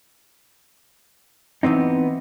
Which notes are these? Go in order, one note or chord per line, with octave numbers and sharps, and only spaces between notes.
E3 B3 C4 D#4